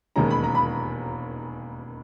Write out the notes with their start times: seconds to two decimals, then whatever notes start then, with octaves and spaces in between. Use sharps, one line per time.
0.16 E1 D#2 D#3 G#3 C#4 A#5
0.31 B5
0.44 A#5
0.55 B5